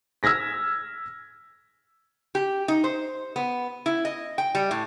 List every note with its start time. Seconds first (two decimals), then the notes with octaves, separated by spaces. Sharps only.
0.23 E6 F6 G#6 A#6 B6
2.35 G4
2.68 D#4
2.84 C5
3.36 B3
3.86 E4
4.05 D#5
4.38 G5
4.55 G3
4.71 A2